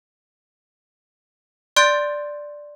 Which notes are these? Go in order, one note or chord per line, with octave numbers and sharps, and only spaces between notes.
D5 C6 F#6 G6 A6 D7